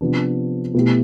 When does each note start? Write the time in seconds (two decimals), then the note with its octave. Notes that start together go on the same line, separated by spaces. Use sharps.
0.01 C3 F3 B3 D4
0.74 B2 A3 E4 G4